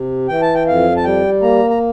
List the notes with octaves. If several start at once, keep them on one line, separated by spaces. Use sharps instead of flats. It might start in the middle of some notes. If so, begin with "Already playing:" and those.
Already playing: C3
E3 G5
A5
G5
F2 F5
A5
G3 G5
A#3 A#5
A#5